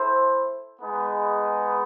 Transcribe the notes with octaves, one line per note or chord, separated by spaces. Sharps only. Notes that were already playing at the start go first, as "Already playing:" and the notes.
Already playing: E4 A4 C5
G#3 B3 D#4 G#4 B4